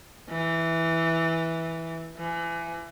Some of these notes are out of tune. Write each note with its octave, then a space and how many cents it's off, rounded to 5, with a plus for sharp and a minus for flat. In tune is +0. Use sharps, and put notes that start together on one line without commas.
E3 -5
E3 +30